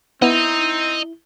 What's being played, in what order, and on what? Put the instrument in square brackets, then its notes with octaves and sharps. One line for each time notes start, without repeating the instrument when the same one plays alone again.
[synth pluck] B3 [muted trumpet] C4 [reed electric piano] E4 [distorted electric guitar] D#5 A#5